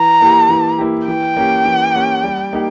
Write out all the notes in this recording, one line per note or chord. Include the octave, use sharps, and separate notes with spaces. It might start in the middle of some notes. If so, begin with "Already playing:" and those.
Already playing: E3 A#5
A#3 E4 G4
E3
A#3 E4 G4
E3 G5
A#3 C#4 G4
E3
A#3 C#4 G4
G3
A#3 D#4 G4